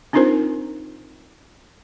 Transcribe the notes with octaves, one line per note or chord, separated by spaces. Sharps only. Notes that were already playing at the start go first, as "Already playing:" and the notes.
C4 D4 D#4 F4 A#4 C5